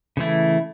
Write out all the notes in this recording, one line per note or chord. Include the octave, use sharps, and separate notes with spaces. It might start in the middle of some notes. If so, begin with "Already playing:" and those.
C#3 E3 A3 E4